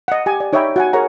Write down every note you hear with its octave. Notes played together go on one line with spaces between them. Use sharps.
D#5 F#5
G4 G#5
D5
D#4 C#5 D#5 E5 G5 B5
F#4 F#5 G#5
G#4 A#4 C#5 F#5 A#5